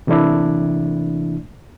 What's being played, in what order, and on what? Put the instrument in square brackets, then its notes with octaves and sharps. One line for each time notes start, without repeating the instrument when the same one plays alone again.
[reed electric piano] C3 E3 A3 A#3 D4 E4